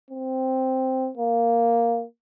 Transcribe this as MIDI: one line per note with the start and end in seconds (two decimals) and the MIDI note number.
0.11 1.10 60
1.17 2.04 58